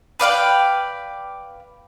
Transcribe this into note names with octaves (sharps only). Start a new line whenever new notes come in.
B4 D5 F5 G5